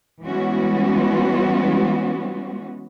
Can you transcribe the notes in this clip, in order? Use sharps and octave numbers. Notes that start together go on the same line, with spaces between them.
E3 G3 G#3 B3 C#4 F#4